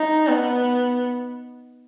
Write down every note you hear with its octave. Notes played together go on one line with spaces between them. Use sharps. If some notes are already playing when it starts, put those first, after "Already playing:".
Already playing: D#4
B3